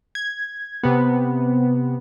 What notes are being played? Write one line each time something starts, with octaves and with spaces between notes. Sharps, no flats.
G#6
C3 B3